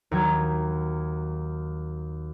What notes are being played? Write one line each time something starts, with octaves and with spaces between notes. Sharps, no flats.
D#2 F#3 G#6